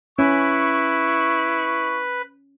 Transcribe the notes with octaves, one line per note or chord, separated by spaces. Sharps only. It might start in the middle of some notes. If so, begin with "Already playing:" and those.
C#4 E4 B4 C#6